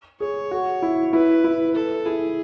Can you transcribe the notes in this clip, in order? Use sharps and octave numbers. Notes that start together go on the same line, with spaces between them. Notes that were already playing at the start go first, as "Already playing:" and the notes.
G#4 C#5
F#4
E4
E4 B4
E4
A4
E4 G#4